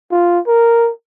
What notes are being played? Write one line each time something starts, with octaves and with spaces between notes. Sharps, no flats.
F4
A#4